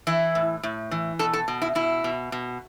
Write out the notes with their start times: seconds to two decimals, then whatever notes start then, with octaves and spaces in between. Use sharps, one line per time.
0.07 E3 E4
0.35 A2
0.63 A2
0.91 E3
1.19 B2 A4
1.33 A4
1.48 B2
1.62 E4
1.75 B2 E4
2.04 B2
2.32 B2